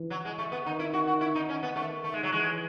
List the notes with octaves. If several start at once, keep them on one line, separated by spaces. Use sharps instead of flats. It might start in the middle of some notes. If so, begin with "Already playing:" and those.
Already playing: E3
F#3
G#3
A3
B3
D#3 D#4
E4
F#4
F#4
E4
D#4
C#4
B3
D#3 A3
A3
G#3
F#3
E3 G#3